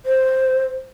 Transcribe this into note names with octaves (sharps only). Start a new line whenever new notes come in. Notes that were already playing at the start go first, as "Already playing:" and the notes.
C5